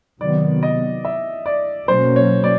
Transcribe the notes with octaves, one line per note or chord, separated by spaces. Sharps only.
C3 D#3 F#3 B3 D5
D#5
E5
D5
B2 F#3 A#3 C#4 C5
C#5
D5